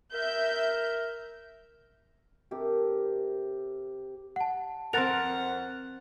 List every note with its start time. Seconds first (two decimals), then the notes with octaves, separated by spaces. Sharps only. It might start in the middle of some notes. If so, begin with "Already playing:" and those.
0.14 A#4 E5 G6
2.51 C3 G4 A4 A#4
4.36 F#5 A5
4.93 F2 C4 A#4 F#5 F#6 A6 F7